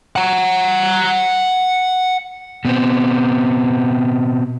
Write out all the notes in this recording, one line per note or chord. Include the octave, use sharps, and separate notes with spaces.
F#5 A#5
B2 B3 C4